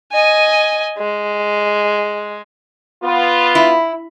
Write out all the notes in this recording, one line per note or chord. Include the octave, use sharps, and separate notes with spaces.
D#5 G#5
G#3
B3 F4
E4